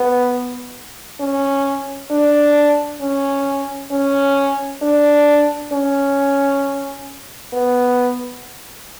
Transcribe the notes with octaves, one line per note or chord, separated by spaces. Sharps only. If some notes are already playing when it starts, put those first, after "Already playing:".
Already playing: B3
C#4
D4
C#4
C#4
D4
C#4
B3